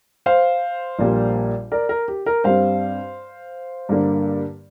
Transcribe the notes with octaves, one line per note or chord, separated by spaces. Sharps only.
C5 F5
A#1 A#2 G3 A#3
A#4 D5
A#4
G4
A#4
G2 G3 C4 C5 F5
G2 D3 A#3 D4